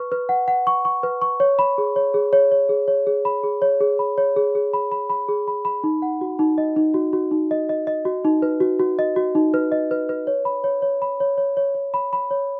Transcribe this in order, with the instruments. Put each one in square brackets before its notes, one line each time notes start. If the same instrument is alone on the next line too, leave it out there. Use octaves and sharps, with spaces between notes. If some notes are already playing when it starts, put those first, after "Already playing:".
Already playing: [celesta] B4 C#6
B4
F#5
F#5
C#6
C#6
B4
C#6
C#5
B5
G#4
C#5
G#4
C#5
C#5
G#4
C#5
G#4
B5
G#4
C#5
G#4
B5
C#5
G#4
G#4
B5
B5
B5
G#4
B5
B5
D#4
F#5
F#4
D#4
D#5
D#4
F#4
F#4
D#4
D#5
D#5
D#5
F#4
D#4
B4
F#4
F#4
D#5
F#4
D#4
B4
D#5
B4
B4
C#5
B5
C#5
C#5
B5
C#5
C#5
C#5
C#5
B5
B5
C#5